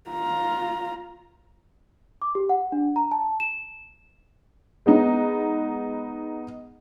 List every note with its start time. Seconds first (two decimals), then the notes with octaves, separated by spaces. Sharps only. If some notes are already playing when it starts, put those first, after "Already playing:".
0.10 F4 A#5
2.22 D6
2.35 G4
2.49 F#5
2.72 D4
2.96 A#5
3.11 A5
3.40 E7
4.86 G#3 B3 D#4